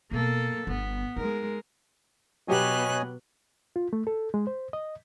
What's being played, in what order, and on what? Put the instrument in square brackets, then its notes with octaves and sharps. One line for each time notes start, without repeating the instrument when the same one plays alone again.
[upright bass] B2 [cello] A#3 A4
[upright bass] G1 [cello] B3
[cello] G#3 A#4 [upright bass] D#4
[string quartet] B2 B3 F#6 [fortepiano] F#3 G4 [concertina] C#5 D#5 G#5
[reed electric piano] F4
A3
A4
G#3
C5
D#5